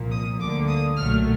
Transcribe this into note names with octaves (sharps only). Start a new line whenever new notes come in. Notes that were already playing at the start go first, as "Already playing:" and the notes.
Already playing: C2 A#2 F3 A#3
D#6
D2 D3 G3 A#3 D6
D#6
B1 A#2 F#3 A3 F6